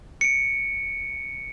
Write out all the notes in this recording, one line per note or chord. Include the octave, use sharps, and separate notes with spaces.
C#7 D7